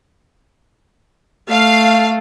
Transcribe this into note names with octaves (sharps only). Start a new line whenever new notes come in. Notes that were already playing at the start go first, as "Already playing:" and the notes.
A3 F5